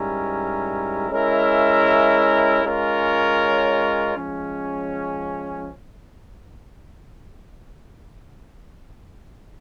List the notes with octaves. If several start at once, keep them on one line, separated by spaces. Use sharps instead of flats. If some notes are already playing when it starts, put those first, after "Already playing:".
Already playing: G#2 G3 C#4 E4 A#4
G#3 C#4 E4 A#4 E5
G#3 C#4 F4 A#4 C#5
F3 G#3 C#4